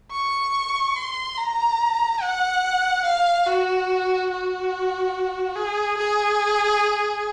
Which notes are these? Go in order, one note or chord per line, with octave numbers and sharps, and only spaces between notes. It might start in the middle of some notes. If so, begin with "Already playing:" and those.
C#6
C6
A#5
F#5
F5
F#4
F#4
G#4
G#4